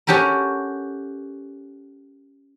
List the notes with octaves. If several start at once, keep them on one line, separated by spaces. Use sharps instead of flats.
C#4 F#4 G4 A4 A#4